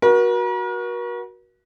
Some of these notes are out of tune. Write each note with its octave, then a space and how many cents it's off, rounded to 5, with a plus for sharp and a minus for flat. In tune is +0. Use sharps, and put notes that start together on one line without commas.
F#4 +0 A#4 +45